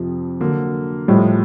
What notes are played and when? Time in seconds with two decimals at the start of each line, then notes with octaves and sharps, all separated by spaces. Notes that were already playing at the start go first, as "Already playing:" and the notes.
Already playing: F2 C3 F3
0.40 D3 F#3 A#3
1.08 A2 F3 G3 G#3